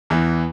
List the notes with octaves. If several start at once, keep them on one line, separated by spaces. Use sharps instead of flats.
E2 E3